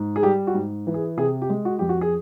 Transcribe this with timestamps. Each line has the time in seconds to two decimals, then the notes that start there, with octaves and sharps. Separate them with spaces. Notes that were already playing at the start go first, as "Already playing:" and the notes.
Already playing: G#2
0.16 G#4
0.23 G3 G4
0.47 F#4
0.54 G#2
0.87 E3
0.94 G#4
1.17 C3 G#4
1.42 G4
1.50 G#3
1.65 F#4
1.79 F2 G4
1.89 F#4
2.01 G#4